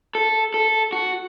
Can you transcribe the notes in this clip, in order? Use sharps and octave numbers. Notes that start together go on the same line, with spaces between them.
A4
A4
F#4